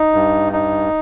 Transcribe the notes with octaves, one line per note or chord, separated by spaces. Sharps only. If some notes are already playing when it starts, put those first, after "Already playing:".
Already playing: D#4
G2
D#4